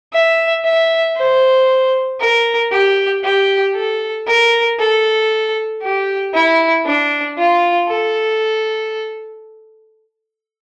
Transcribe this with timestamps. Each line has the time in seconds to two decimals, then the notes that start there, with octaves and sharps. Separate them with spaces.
0.13 E5
0.65 E5
1.17 C5
2.20 A#4
2.72 G4
3.24 G4
3.75 A4
4.27 A#4
4.79 A4
5.82 G4
6.34 E4
6.85 D4
7.38 F4
7.89 A4